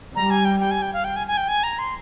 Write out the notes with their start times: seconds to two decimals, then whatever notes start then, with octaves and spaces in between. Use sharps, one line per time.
0.15 G3 A#5
0.30 G#5
0.45 G5
0.60 G5
0.71 G#5
0.82 G5
0.93 F5
1.04 G5
1.16 G#5
1.27 G#5
1.37 G5
1.48 G#5
1.63 A#5
1.79 C6